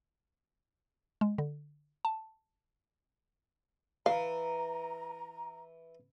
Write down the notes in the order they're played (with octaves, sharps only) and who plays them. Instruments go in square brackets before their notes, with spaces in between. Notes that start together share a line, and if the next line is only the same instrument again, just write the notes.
[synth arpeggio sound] G#3
D3
A5
[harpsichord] E3 [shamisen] F5 [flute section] A#5